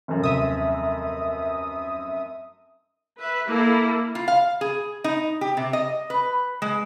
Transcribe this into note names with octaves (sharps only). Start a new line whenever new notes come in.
F1 F#2
D#2 C3 E5 D#6
B4 E5
A#3 E4 A4
F4
F5
G#4
D#4
G4
C3
D#5
B4
G#3